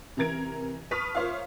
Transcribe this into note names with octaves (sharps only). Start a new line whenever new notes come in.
C3 E3 A#4 A#5 G#6 D7
B4 A5 C#6 D#6 F6 B6
F4 A#4 C5 C#5 E5 F5